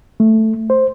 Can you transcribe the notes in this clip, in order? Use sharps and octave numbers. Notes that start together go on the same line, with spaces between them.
A3
C5